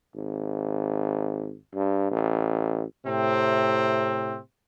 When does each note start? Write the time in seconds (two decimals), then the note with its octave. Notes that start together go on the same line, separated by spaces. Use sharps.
0.15 G#1
1.75 G2
2.11 A1
3.06 A2 C3 C4